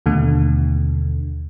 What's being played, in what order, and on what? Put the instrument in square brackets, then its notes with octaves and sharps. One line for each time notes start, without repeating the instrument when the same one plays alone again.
[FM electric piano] D#2 B2 D3 A3